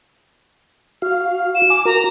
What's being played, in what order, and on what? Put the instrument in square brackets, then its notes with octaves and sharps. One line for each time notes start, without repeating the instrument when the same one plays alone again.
[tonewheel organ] F#4 F5 [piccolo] F6
[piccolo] E7
[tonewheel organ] G#5 D6
[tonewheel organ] F#4 A#4 [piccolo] A#5